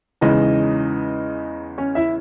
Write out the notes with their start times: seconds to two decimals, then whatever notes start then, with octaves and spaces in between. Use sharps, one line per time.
0.21 E2 C#3 E3 G#3 D#4 D#5
1.78 C#4 C#5
1.95 E4 E5